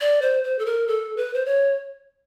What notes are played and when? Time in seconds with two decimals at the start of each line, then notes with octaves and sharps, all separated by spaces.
0.01 D5
0.22 C5
0.44 C5
0.59 A4
0.66 A#4
0.88 A4
1.17 B4
1.34 C5
1.46 C#5